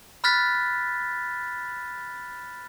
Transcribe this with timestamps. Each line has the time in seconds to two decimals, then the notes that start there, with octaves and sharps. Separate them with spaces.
0.24 B5 F6 F#6 A6 B6